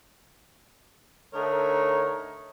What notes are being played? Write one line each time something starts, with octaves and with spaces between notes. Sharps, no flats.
D3 A3 D#4 A#4 C#5